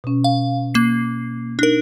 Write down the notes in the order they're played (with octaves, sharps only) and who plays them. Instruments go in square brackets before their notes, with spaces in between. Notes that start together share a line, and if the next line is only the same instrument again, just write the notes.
[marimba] B2 C#4
[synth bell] F5
A#3 C7
[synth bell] D4 A#4 [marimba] D#4